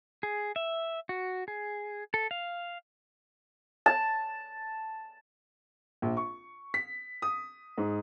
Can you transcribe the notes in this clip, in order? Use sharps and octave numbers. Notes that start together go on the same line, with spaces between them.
G#4
E5
F#4
G#4
A4
F5
A5
A#1
C#6
B6
D#6
G#2